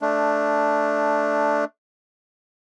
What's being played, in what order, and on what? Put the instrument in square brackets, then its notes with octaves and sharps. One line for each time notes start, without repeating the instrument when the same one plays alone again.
[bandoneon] A3 D4